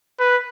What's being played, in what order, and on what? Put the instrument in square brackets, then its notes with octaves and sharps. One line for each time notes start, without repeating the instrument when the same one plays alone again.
[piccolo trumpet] B4